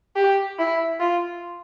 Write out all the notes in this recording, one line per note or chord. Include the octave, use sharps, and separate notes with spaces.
G4
E4
F4